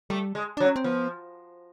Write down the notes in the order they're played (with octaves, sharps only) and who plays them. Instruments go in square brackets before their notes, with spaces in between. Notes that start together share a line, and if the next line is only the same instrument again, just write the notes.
[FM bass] G3 [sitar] A3
[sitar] G#3
[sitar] F#3 [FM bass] D4
[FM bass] C#4
C4
[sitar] F3 [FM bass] B3